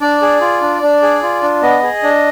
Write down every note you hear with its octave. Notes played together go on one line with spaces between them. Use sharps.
D4 D5
G#4
F4
D4
D4
G#4
F4
D4
B3 D#5
G#4
D4